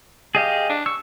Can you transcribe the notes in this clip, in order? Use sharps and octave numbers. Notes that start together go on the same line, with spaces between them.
G4 G#4 D#5 F5
D4
C#6 E6